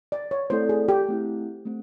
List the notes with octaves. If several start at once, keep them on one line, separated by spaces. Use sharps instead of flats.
D5
C#5
A3 C4 E4 A4 C5 D5
G#4
G4
A3 C4 E4
A3 C4